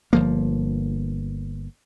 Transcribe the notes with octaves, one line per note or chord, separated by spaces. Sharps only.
G1 F3 A#3